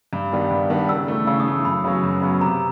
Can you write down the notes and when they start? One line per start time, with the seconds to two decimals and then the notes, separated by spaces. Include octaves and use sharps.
0.13 G2
0.32 D#3 G3 B3 D4
0.51 G2
0.70 D#3 G3 B3 D4
0.89 C#3 E6
1.08 E3 A3
1.27 C#3 E6
1.40 D#6
1.46 E3 A3
1.65 F#2 B5
1.84 C#3 F#3 B3
2.03 F#2
2.22 C#3 F#3 B3
2.41 C3 A#5